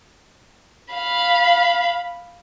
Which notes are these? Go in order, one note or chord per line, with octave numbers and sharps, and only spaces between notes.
F5 B5